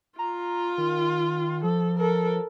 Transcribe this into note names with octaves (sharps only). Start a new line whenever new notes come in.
F4 A#5
D#3
F3 A4
A4 A#4